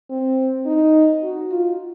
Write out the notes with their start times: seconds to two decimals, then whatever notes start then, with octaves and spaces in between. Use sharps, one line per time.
0.10 C4
0.66 D#4
1.23 F#4
1.51 F4